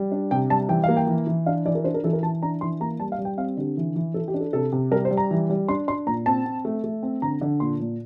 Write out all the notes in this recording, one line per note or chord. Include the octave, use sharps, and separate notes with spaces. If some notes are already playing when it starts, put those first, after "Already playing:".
Already playing: G3
D4
C3 G5
G3 A5
E3 G5
A#3 F5
G5
E3
E3
D4 F5
E3 D5
A#4
D4 C5
A#4
E3 A4
A#4
E3 A5
D4 A#5
E3 C6
A#3 A#5
G3 A5
F5
G3
G5
C4 F5
D3 G4
E3
E3
E3 A4
G4
D4
A4
C3 A4
C3
G3 A#4
C5
G3
A#5
E3
G3
D4 C6
D4 C6
A#2 A#5
C4 A5
C4
A3
A3
C4
D3 A#5
D3
A#2 C6
A#2